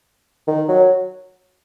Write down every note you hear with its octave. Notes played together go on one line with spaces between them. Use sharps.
D#3
F#3